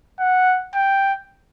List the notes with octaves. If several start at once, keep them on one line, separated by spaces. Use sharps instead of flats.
F#5
G5